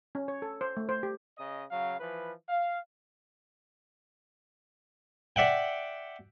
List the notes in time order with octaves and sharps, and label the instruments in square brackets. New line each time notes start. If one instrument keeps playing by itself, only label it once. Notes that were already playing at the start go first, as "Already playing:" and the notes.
[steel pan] C#4
C#5
A4
C5
A3
C5
G4
[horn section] C#3 D#5
C#3 F#3 F5
E3 F3 B4
F5
[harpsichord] D5 E5 F#5 G5